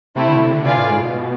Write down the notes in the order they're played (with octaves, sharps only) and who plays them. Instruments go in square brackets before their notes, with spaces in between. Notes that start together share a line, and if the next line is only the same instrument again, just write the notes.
[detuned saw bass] C3 [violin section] A3 C4 E4
[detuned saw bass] D3
B2
C3
D3
[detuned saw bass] C3 [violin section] F4 B4 D5 F5 G#5
[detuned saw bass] A2
G#2
B2